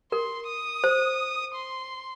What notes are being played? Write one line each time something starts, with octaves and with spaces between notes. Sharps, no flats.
A#4 C6
D#6
C5
C6